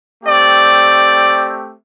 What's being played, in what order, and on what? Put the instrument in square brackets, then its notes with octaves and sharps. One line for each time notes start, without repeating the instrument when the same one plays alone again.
[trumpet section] A3 C4 G4 D5